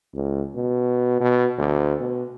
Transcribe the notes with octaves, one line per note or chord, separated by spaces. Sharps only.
C#2
B2
B2
D2
B2